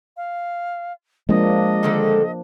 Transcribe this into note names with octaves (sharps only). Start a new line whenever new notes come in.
F5
F3 G#3 A#3 D4 D#5
D3 D#3 A4